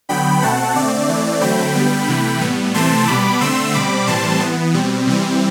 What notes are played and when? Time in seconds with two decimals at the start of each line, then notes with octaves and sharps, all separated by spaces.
0.09 D3 F#3 B3 G5 B5
0.42 B2 A3 C4 F#5 A5
0.75 D3 A3 C4 D5
1.09 E3 A3 C4
1.41 D3 F#3 A3 C4 G5 B5
1.75 D3 G3 B3
2.08 C3 E3 A3
2.41 A2 G3 B3
2.74 C3 E3 A3 C4 A5 C6
3.07 B2 G3 B3 B5 D6
3.40 D3 A3 C4 C6 E6
3.74 B2 G3 C4 B5 D6
4.07 A2 E3 G3 C4 A5 C6
4.40 E3 B3
4.74 B2 G3 C4
5.07 C3 E3 G3 C4